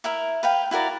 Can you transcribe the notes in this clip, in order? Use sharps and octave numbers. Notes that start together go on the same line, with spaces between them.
E4 A#4 E5
B4 F5 G5
E4 F#4 A#4 D5